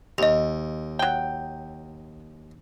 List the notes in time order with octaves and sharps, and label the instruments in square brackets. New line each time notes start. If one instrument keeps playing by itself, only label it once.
[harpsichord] D#2 [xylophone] D#5 F7
[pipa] F#3 G5